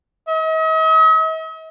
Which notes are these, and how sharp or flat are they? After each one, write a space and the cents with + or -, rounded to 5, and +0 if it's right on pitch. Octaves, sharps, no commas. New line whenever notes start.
D#5 +45